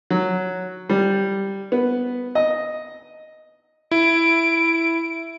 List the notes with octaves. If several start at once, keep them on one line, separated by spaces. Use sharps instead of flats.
F#3
G3
B3
D#5
E4 D7